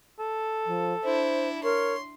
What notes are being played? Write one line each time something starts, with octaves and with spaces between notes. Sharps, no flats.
A4
F3
D4 E4 C5
A#4 C#5 C6